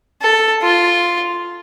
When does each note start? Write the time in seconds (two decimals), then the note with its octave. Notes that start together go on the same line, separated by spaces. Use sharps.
0.21 A4
0.62 F4